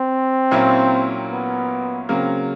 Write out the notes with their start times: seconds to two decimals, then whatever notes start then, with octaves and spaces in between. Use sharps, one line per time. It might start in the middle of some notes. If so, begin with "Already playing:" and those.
Already playing: C4
0.51 A#2 F#3 A#3 C#4 E4
1.30 B3
2.09 C#3 F#3 A#3 C4